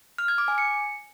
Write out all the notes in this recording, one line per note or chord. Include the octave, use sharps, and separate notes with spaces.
F6
G#6
D6
G#5
C#7